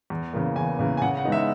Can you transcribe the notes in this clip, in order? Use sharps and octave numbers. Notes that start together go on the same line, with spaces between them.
E2
C#3 E3 A#3
E2 G#5
C#3 E3 A#3
G#5
C#3 F#5
F#5
E3 G#3 B3 D#4
E5